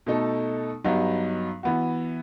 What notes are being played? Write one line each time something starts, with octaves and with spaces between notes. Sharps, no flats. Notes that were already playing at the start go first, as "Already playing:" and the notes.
B2 A3 D#4 A4
G2 F#3 B3 D#4
E3 B3 F#4